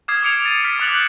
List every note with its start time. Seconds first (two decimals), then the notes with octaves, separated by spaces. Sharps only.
0.08 D6 D#6 F6 G#6 C7
0.23 D6 G#6 C#7 D7 F7
0.45 A6 D#7
0.64 D#6 F6 B6 C#7
0.79 D6 D#6 F#6 A6 F7 F#7
0.92 D6 G6 A6